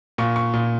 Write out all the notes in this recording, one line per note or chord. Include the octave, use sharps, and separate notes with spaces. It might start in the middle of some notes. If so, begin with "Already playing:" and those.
A#2 C#6
C#6
A#2